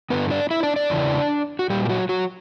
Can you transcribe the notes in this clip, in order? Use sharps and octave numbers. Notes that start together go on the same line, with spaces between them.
G2 D3 B3 B4
D4 D5
E4 E5
D4 D5
D4 D5
E2 C#3 E3
F#4
A#2 G3 G4
G4
F#3 F#4
F#3 F#4